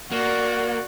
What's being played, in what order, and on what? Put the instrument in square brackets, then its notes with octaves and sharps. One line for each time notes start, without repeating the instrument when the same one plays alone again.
[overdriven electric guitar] A#3 [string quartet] F#4 D5